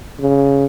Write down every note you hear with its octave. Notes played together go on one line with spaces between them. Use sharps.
C#3